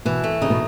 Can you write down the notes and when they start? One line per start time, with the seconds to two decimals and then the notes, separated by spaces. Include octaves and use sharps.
0.05 B2 E3
0.24 A3
0.42 C#3 D#4
0.50 B2